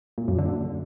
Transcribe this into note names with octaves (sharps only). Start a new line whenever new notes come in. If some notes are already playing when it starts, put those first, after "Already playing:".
A#2
F#2
D3